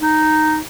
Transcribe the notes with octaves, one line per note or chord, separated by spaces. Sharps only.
D#4